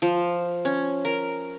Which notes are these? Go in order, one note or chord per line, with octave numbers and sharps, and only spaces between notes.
F3
C#4
A#4